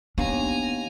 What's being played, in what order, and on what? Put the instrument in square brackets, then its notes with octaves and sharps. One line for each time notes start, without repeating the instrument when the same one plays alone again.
[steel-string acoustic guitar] D#2 [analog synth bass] B3 [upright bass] D4 [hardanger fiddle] G#5 A#5